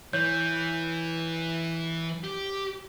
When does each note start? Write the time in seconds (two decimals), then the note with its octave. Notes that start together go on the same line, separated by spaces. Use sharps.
0.13 E3 C#5 G6
2.24 G4